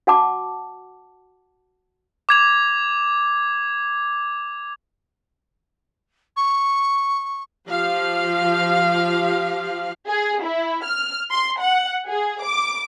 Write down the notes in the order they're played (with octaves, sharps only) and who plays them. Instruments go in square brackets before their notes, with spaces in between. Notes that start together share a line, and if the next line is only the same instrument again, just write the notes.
[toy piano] F#4 F#5 A5 D6
[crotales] D6 G#6 F7
[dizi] C#6
[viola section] F3 G4 F5
[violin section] G#4
E4
F6
C6
F#5
G#4
D6